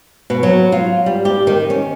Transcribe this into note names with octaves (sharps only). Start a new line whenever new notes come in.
B2
F#3
F4
G3
G4
D#3
C#4